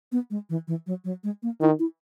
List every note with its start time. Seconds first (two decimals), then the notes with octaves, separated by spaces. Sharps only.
0.12 B3
0.30 G#3
0.50 E3
0.68 E3
0.87 F#3
1.04 F#3
1.24 G#3
1.43 A#3
1.61 D#3 E4
1.79 E4